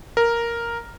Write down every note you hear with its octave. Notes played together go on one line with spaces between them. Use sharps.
A#4